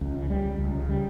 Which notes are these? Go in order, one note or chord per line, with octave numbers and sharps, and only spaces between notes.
C#2
C#3
G3
C#2
C#2
C#3
G3